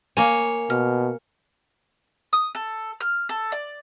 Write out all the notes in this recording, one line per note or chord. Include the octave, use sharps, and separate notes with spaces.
A#3 C#5 G#5
B2 F6
D#6
A4
F6
A4
D5